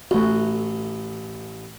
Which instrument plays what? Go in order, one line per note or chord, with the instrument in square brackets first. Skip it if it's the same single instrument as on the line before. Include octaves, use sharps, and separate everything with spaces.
[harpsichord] A1 [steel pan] A3 F#4